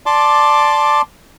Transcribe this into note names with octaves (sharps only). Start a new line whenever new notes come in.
D5 A5 C6 D6